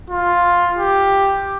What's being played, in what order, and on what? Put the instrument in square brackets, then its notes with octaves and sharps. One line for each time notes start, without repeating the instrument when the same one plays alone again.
[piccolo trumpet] F4
G4